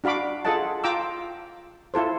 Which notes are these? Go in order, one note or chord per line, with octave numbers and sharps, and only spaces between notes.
D4 F#4 F5 B5 D6
F4 G#4 A4 D#5 F#5 A5
F4 G5 A#5 D6 E6
E4 F4 A4 C5